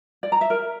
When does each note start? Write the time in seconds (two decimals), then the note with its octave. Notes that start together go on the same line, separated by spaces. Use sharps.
0.23 D5
0.32 A#5
0.41 E5
0.50 A#4